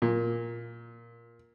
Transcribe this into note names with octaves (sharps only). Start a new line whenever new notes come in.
A#2